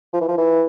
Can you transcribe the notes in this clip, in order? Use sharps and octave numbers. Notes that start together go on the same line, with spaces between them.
F3
E3
F3
E3